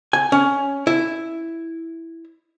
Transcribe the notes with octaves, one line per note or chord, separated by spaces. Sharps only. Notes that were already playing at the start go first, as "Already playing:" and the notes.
G#5
C#4
E4